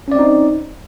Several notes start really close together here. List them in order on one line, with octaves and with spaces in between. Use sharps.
C#4 D5 C4 D#4